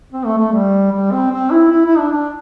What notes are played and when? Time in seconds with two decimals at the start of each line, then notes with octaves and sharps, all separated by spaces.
0.12 C4
0.26 A3
0.38 A3
0.52 G3
0.92 G3
1.12 C4
1.31 C4
1.51 E4
1.71 E4
1.85 E4
1.98 D4
2.11 D4